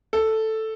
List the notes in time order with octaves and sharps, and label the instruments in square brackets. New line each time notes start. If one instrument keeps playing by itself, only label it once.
[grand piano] A4